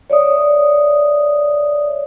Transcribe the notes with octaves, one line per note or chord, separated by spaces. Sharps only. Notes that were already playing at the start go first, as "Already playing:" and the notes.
C#5 D5 E5 D#6